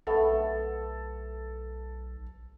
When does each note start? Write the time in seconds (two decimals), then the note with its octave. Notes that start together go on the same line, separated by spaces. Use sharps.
0.07 B1 A3 B3 A4